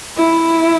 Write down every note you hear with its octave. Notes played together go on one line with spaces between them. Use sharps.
E4